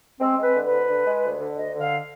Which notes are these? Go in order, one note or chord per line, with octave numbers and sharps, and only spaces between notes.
G#3 C4
G#3
B4
D3
D2 B4
D3
G#3
D2
D3
D2 D#5
D3
F5